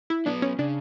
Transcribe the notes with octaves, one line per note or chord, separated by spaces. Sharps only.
E4
F#3 B3 D4
C#4
C#3 D4